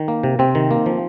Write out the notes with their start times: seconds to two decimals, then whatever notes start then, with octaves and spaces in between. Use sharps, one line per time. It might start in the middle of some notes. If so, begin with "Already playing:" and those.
Already playing: D#3
0.08 A#3
0.23 C3
0.39 C3 C4
0.55 D#3
0.71 A#3
0.86 F3